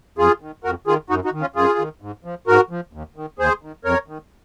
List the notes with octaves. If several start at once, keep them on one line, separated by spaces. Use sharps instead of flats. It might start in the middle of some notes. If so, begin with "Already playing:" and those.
F2 F4 G#4
D#3
F2 F#4 A#4
D#3 F4 G#4
F#2 D#4 F#4
D#4 F#4
D#3
C#4 F4
F#2 F4 G#4
D#3
G#2
F3
G#2 F#4 A#4
F3
D#2
D#3
D#2 G#4 C5
D#3
F2 A#4 C#5
D#3